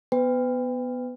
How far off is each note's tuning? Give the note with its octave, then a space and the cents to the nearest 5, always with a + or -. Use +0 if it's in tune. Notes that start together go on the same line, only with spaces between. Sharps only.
B3 +0 B4 +35 G5 +30